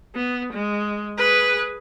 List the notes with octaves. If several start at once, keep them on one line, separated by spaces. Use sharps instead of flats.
B3
G#3
G#4 B4